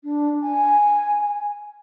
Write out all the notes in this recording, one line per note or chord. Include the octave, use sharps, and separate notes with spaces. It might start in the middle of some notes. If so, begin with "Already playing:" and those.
D4
G#5